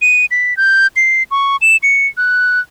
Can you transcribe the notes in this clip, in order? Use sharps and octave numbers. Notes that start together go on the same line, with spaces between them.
D#7
B6
G6
C7
C#6
E7
C#7
F#6